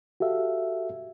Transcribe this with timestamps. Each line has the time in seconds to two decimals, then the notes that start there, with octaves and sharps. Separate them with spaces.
0.20 F#4 G4 A4 E5 F5